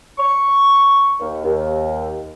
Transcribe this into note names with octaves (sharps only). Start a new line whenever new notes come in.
C#6
D#2
D#2